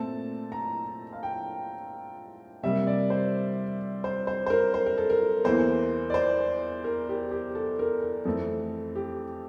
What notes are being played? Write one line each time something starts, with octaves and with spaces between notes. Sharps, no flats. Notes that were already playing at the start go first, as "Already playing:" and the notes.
Already playing: A#2 A3 C4 A5
A#5
F5
G5
C3 G3 A#3 E5
D5
C5
C5
C5
C5
A#4
C5
A#4
A4
A#4
E2 E3 A#3 C5
D5
C5
A#4
G4
G4
A4
A#4
A#4
F2 E3 A3 C4 A4
G4